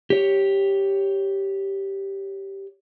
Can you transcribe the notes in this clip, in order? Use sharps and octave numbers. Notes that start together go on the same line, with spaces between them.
G4 C#5